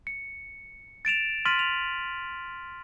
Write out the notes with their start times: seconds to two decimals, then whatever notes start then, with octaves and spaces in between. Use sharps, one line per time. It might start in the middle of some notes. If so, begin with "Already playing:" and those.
0.07 C#7
1.05 A6 D7 E7 F7
1.45 C6 F6 A6 B6 D#7 F#7
1.59 F7